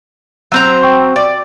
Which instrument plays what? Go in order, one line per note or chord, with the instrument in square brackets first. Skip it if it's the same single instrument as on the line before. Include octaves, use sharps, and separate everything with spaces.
[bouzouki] F#3 C4 A#5 [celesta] E6 G6
[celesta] G5 C#6 G6
[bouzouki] D5 [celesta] D6